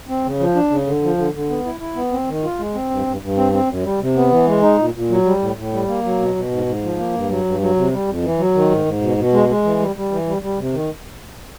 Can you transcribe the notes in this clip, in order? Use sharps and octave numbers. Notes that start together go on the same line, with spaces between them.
C4
C#3
F3
D4
C#3
D3
F3
D3
D3
B3
E4
E4
B3
C4
D#3
F4
G#3
C4
G2
G2
G2
C4
C4
F#2
G3
C3
B3
E3
G#3
D#4
A#2
A#2
F#3
G3
A2
A2
G3
A#3
F#3
B2
B2
G#2
G#2
F3
A#3
G2
F#3
G2
F#3
C3
G3
F2
E3
F#3
D#3
G#2
G#2
B2
B2
G#3
G#3
E3
G3
G3
E3
G3
G3
C3
D#3